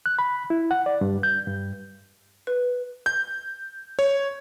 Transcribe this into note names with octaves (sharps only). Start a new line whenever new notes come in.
F#6
B5
E4
F#5
D5
G2
G6
G2
B4
G6
C#5